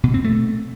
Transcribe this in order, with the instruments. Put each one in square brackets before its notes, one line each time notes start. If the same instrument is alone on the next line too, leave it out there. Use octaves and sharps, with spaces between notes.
[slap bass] B2
C4
A3